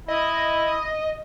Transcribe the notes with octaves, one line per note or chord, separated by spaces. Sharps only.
E4 D#5